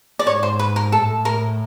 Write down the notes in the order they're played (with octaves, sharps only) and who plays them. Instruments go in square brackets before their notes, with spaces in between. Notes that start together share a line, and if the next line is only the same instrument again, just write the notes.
[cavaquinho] D5
[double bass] G#2 [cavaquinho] C#5
[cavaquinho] C5
B4
A#4
[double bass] A2 [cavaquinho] A4
[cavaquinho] A#4